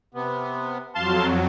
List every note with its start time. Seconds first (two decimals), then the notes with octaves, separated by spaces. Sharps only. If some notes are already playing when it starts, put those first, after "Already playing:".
0.14 C3 B3
0.95 F2 F#3 F5 A5 C6